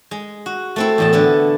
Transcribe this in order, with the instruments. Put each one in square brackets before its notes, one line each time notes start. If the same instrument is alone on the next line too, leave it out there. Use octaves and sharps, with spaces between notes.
[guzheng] G#3
F#4
A3 C4 E4
E2 A2 A5
D3 B3 E4